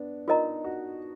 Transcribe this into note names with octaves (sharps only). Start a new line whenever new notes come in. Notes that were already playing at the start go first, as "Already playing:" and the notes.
Already playing: B3 D4
D#4 F4 A#4 D#5 A#5
F#4